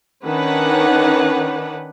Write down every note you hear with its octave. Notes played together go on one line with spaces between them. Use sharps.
D#3 C#4 D4 B4 F#5